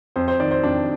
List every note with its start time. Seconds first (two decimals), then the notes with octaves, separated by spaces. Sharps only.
0.16 F2 C5
0.28 C5
0.40 D#3 D5
0.51 C5
0.63 F2 D4